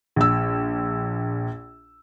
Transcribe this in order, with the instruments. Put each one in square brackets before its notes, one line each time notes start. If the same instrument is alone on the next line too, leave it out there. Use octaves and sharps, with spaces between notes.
[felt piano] A#1 E6